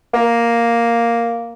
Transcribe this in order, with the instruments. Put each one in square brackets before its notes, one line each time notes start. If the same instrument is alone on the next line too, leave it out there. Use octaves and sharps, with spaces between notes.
[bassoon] A#3